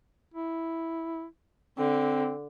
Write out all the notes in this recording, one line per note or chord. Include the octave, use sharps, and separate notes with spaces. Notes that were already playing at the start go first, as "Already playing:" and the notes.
E4
D3 C4